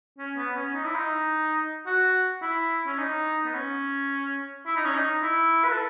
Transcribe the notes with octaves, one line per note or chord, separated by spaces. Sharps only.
C#4
B3
C#4
D#4
E4
D#4
F#4
E4
C#4
D#4
B3
C#4
E4
D#4
C#4
D#4
E4
B4
A4